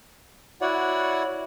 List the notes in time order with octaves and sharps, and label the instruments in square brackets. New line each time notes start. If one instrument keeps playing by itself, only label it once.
[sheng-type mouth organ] E4 F#4 C#5 D5 F#5